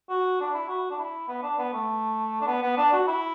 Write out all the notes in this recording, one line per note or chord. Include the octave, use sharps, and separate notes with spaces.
F#4
D4
E4
F#4
D4
E4
B3
D4
B3
A3
D4
B3
B3
D4
F#4
E4